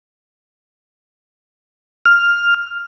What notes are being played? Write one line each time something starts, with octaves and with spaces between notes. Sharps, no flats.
F6